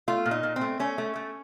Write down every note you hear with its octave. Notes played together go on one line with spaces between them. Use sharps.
A3 F4
A#2
D#4
A#2
C4
A3
A3 C#4
A3
A3